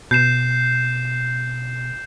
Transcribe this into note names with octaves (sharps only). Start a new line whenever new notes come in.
B2 G6 C7 E7